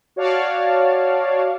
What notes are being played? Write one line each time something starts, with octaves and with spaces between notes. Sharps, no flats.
F#4 C#5 D5 F5 A5